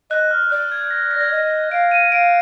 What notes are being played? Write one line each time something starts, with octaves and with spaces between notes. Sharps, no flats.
D#5 F#6
F6
D5 F#6
G#6
A#6
A#6
D5 G#6
D#5 A#6
F5 D7
D#7
F5 D7